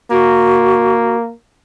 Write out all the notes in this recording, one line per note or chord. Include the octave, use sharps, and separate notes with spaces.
A#3 F#4